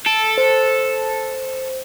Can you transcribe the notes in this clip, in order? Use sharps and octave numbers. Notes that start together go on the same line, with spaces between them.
A4 D7
C5